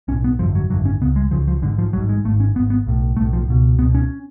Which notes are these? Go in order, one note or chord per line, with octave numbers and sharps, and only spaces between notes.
B1 A2 C#4
B3
G#1 F#2 D3 F3
F#3
G#1 F#2 D3 F#3
C#4
C#2 C#3 B3
G#3
C#2 C#3 F3
F3
A1 G#2 D3
F3
A1 G#2 F#3
G#3
G#1 G#2 A3
C#4
G#1 G#2 B3
B3
B1 A2
B1 A2 A3
F3
C#2 B2
C#2 B2 B3
C#4